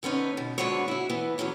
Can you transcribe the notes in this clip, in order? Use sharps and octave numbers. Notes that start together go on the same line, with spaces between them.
D3 B3 C#4 D#4
B2
D3 G#3 B3 D4 F#4 C#5
E4 F#4
E3 B3
E2 G#2 F#3 C#4 C#5